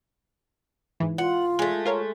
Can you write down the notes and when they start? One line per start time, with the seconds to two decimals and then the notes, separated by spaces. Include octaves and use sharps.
1.00 G#2 E3
1.18 F4 F#5
1.59 G#3 A3
1.85 F4 A#4 C#5